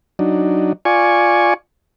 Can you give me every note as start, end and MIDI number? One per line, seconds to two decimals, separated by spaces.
0.19 0.73 54
0.19 0.73 62
0.19 0.73 63
0.85 1.54 65
0.85 1.54 74
0.85 1.54 80
0.85 1.54 85